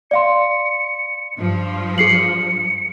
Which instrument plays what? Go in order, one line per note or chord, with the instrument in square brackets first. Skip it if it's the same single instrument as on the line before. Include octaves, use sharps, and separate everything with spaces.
[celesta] D5 F5 C6 [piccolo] C#7
[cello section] G2 F3
[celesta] G#4 C7 F#7 [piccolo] C#7